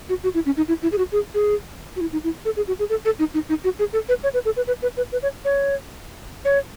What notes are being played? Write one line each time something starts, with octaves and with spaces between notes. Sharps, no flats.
F#4
F#4
E4
C#4
D#4
E4
E4
G#4
F#4
G#4
G#4
F#4
E4
D#4
E4
A4
G#4
F#4
G#4
A4
A4
D#4
D#4
D#4
F#4
G#4
A4
B4
C#5
B4
A4
B4
B4
B4
B4
B4
C#5
C#5
C#5